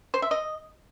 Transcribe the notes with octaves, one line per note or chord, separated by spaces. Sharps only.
C5
E5
D#5